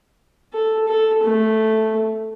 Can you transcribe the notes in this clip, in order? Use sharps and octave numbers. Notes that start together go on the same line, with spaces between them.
A4
A4
A3